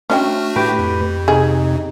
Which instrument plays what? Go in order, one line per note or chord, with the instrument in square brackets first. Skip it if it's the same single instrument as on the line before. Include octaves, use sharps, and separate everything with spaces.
[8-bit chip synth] A3 D4 F#4 [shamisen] C#4 D#5 G5
[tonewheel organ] A2 B4 [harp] G4
[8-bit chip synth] F2
[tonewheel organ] C3 D#4 [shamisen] G#4